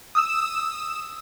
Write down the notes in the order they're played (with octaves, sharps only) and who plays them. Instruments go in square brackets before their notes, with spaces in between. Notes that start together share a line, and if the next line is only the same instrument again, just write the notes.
[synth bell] D#6 E6 E7